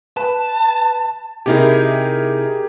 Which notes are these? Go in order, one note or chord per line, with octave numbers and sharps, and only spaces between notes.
B4 A5
C3 D#4 E4 G4 G#4 A#4